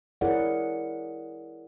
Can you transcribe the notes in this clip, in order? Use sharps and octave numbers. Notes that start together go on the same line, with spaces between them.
E4 G#4 A#4 C#5 D5 F#5